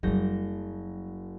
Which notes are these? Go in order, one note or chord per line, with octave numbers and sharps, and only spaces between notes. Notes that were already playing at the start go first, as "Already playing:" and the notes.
F#1 F#3 G3 G6 A#6